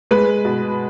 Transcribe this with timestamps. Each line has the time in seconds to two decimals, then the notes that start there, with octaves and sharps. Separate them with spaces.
0.11 G#3 B4
0.45 B2